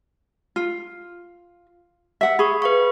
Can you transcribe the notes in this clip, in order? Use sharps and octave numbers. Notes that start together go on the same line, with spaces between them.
F4
E5 F#5
G#4 B5 C#6
B4 F5 C#6